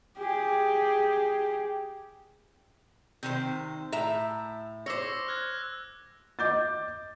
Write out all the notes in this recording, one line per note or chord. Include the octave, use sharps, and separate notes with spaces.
G4 G#4
C3 D#3 C5 G6
A2 E5 A#5
C5 C#5 D6 E6 A#6
F6 F#6 G#6
D#5 D6 G6 A6